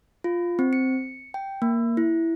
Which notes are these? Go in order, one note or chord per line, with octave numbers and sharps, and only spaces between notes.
F4
C4
C#7
G5
A#3
E4